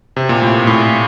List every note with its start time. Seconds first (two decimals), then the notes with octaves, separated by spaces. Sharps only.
0.16 C3
0.29 A#2
0.42 A2
0.67 A2